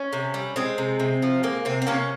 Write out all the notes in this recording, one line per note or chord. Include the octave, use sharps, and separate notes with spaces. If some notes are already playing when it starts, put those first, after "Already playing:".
Already playing: C#4
C3
G3
G#3 C4
C3
C3
F3
G#3 A#3
C3 C4
C4
C3 A#3 C#4